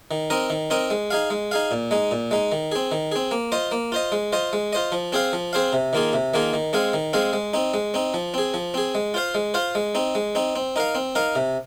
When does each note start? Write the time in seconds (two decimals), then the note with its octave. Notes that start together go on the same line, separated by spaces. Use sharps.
0.11 D#3
0.30 C4 D#4 A#4 D#5
0.50 D#3
0.70 C4 D#4 A#4 D#5
0.90 G#3
1.10 D#4 G#4 F5
1.30 G#3
1.51 D#4 G#4 F5
1.71 A#2
1.91 G#3 D#4
2.11 A#2
2.31 G#3 D#4
2.52 D#3
2.72 C4 G#4
2.92 D#3
3.12 C4 G#4
3.31 A#3
3.52 F4 C5 D#5
3.72 A#3
3.92 F4 C5 D#5
4.12 G#3
4.32 F4 C5 D#5
4.53 G#3
4.73 F4 C5 D#5
4.92 F3
5.13 C4 G#4 C5 F5
5.33 F3
5.53 C4 G#4 C5 F5
5.73 C3
5.93 D#3 A#3 F4 G#4
6.13 C3
6.34 D#3 A#3 F4 G#4
6.53 D#3
6.73 G#3 C4 G#4 F5
6.94 D#3
7.13 G#3 C4 G#4 F5
7.33 G#3
7.53 C4 D#4
7.74 G#3
7.94 C4 D#4
8.14 F3
8.34 C4 G#4
8.54 F3
8.74 C4 G#4
8.95 G#3
9.14 F4 C5 F5
9.35 G#3
9.54 F4 C5 F5
9.75 G#3
9.95 C4 D#4
10.15 G#3
10.35 C4 D#4
10.56 C4
10.76 D#4 A#4 F5
10.95 C4
11.15 D#4 A#4 F5
11.35 C3